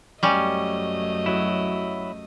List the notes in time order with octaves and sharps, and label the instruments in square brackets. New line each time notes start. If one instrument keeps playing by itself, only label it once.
[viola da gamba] F#2 A3 D#5 [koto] G3 C#4
[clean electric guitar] F#3 E4